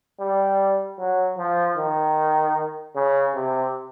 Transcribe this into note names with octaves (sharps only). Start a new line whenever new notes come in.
G3
F#3
F3
D#3
C#3
C3